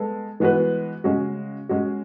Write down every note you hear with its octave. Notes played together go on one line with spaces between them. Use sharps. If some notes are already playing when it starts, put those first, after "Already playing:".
Already playing: G#3 B3 A4
E3 G#3 B3 F#4 B4
C#3 G#3 C#4 F#4
G#3 C#4 F#4